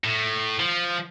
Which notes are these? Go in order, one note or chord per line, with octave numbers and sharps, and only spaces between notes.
A2
F3